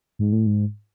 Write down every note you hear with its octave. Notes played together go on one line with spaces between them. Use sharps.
G#2
A2
G#2